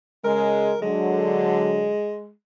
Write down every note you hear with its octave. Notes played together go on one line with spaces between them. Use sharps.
C#3 G#3 A#4
D3 F#3 G#3